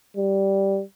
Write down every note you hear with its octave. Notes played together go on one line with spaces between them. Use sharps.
G3